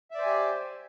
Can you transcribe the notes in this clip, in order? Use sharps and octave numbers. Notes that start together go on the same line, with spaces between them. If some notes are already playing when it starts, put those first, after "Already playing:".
G4 C5 D5 E5 G#5